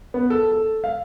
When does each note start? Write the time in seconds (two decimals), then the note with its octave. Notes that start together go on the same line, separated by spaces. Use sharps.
0.14 B3
0.30 A4
0.52 A4
0.84 F5